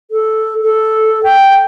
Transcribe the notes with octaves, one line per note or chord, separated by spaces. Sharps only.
A4
A4
G5